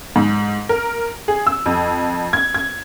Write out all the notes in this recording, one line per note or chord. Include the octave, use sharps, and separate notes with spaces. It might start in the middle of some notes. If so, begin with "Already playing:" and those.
G#2
A#4
G#4
E6
F2
G#6
G#6